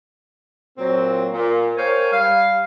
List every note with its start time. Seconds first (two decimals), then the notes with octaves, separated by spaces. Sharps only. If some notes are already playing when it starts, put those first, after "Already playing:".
0.77 A#2 F#3 C4
1.32 A#2
1.76 A#4 C5 C#5 F5 G5 G#5
2.11 G3 F5